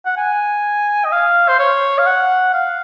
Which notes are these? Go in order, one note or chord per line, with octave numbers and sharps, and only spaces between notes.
F#5
G#5
D#5
F5
C5
C#5
F5
F#5
F5